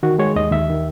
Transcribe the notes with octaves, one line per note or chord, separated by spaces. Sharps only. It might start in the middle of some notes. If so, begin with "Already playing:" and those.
D#3 F#4
G#3 C#5
D#2 D#5
D#2 E5
D#3